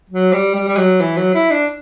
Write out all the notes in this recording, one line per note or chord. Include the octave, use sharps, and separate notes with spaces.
F#3
G3
G3
G3
F#3
E3
F#3
E4
D4